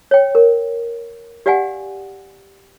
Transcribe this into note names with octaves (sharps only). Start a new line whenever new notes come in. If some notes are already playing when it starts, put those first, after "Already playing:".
C#5 G5
A#4
G4 D5 F5 F#5 G#5